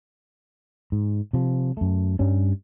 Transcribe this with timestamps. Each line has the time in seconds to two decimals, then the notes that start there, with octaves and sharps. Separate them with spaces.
0.92 G#2
1.33 C3 F3
1.77 F#2 A3
2.19 G2 G3 C#4